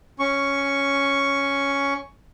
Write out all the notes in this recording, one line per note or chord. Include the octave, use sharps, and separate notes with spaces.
C#4 C#6